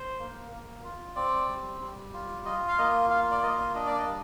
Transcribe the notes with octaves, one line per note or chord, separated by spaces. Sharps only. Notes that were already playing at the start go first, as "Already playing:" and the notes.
Already playing: C5
A#3
A#3
F4
C4 D5
G3
G3
F4
F4 D#5
F5
A#3 D#5
F4 F5
D5
A#3 D#5
D4 D#5
D5
D#5
G3